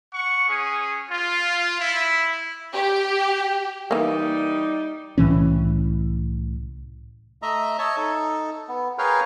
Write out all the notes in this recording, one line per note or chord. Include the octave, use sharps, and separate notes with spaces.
F#5 C#6
C#4 G#4
F4
E4
G4
E3 G3 A#3 D#4
C2 A2 E3 C#4
A3 D#5 E5 A#5
C#5 D#5 E5 A5
D#4 A4
B3
G#4 A#4 B4 C#5 F5 G5